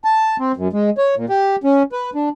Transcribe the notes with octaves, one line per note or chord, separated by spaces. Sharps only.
A5
C4
F#2
G#3
C#5
A#2
G4
C#4
B4
D4